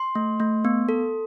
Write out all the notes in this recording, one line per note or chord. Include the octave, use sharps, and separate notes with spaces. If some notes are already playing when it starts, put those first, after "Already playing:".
Already playing: C6
A3
A3
B3
A4